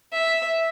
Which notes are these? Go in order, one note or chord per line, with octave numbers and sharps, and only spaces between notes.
E5